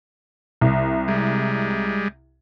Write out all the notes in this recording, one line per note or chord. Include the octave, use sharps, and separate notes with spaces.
C2
G3 G#3